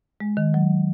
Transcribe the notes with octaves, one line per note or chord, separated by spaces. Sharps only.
G#3
D#3
F#3